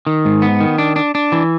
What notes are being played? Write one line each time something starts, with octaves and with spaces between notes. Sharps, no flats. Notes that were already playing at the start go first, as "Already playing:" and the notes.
D#3
G#2
B3
D#3
D4
D4
D4
E3